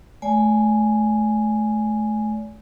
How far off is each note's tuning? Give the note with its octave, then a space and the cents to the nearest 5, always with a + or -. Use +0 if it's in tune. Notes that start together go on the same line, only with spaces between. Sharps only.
A3 -30 D5 -40 G#5 +0